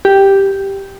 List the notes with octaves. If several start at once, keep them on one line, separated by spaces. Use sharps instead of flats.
G4